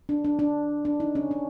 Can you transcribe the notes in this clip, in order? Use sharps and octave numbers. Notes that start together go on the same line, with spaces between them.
D4
D4
D4
D4
D#4
C#4
C#4